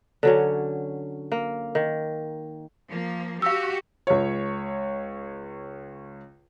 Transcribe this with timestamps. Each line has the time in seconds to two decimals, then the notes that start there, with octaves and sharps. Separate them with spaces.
0.23 D3 F#3 C#4
1.32 A#3
1.75 D#3
2.88 F3 A#3
3.42 F#4 G4 F5 E6
4.07 C#2 C#5